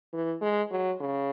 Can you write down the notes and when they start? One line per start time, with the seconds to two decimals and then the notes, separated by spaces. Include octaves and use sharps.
0.13 E3
0.41 G#3
0.71 F#3
1.01 C#3